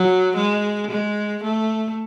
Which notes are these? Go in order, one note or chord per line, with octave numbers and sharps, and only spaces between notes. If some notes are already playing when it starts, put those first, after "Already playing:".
Already playing: F#3
G#3
G#3
A3